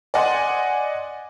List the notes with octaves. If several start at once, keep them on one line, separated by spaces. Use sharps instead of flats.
D5 D#5 F#5 G#5 C6